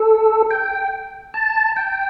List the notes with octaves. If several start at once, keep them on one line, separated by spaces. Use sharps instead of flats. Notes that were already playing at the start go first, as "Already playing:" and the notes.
Already playing: A4
G5
A5
G5